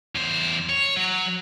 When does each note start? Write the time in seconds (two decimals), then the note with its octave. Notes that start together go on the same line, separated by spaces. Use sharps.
0.15 E2 C5
0.69 C#5
0.97 F#3